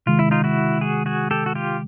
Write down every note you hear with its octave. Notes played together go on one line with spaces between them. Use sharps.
C3 D#3 G#3 F4
E4
D#4 F4
E4 F#4
F#4 G#4
F#4 G#4
G4 A4
F#4
F4 G4